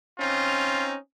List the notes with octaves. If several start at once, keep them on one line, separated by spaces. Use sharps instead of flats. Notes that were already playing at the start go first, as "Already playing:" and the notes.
C4 C#4 D#4 F4